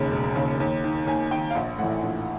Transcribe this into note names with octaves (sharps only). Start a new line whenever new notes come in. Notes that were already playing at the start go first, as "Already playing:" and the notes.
Already playing: E1 D#2 C#3
E1
D#2 C#3
D#2
D#3
D#2 G#5
D#3 G5
F5
A#1 F#5
A2 E3 F#5
A#1